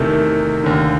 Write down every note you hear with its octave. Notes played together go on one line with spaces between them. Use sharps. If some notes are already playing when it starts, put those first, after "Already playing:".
Already playing: E2 C3 D#3 A3 A4
D#2 D3